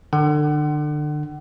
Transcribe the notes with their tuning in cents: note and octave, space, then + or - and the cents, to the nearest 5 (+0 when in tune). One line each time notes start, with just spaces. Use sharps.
D3 +30 F#5 +30